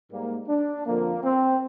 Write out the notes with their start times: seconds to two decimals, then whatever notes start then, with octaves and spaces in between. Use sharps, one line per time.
0.10 G#2 G3 A#3
0.48 D4
0.85 F2 D3 F3 A#3
1.23 C4